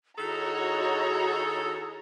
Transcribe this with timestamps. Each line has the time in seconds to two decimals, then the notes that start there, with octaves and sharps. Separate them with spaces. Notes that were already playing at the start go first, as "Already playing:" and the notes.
0.18 D#3 D#4 E4 F#4 G#4 A4 C#5 A#5